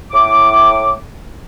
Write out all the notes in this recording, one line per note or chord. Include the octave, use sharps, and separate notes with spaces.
A2 D6